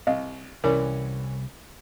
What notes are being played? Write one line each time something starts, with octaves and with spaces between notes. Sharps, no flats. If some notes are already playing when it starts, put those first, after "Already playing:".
C2 D#5 F5
C2 E3 C#4 A#4 D5